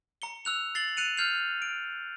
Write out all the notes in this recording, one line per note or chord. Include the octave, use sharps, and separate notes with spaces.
A#5 C#7 G7
E6 F#6 F7
A6 C7 F#7 G7
F#6 C#7 D#7 F7
F6 G6 C7 F7
D7